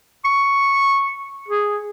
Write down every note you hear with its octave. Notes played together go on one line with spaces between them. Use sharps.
C#6
G#4